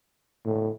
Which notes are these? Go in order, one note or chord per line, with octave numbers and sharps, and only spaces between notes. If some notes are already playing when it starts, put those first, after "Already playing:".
A2